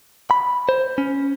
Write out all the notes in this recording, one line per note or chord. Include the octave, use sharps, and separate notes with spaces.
B5
C5
C#4